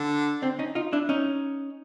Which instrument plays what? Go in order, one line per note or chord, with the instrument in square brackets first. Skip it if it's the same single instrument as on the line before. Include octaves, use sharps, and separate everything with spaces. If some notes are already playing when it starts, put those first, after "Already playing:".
Already playing: [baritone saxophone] D3
[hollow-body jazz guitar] C4 D4
C#4 D#4
D#4 F4
D4 E4
C#4 D#4